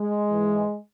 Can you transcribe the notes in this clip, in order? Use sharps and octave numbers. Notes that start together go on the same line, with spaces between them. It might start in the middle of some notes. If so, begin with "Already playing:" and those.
Already playing: G#3
G#2 E3